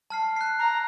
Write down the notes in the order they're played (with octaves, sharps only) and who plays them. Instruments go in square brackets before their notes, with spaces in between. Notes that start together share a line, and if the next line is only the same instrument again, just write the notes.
[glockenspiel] A5 F6 C7
F#6 C7
[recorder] A#5